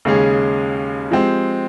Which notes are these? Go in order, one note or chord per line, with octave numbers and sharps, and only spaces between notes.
D#2 C#3 G#3 C#4 G#4
F3 G#3 C4 G4